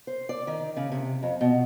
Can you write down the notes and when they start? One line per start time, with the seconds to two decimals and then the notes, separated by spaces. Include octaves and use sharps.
0.07 C5
0.29 D5
0.47 D#3
0.77 C#3
0.92 C3
1.23 F2
1.41 B2